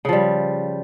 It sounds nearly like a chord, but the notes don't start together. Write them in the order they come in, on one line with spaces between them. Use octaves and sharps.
C#3 F3 G3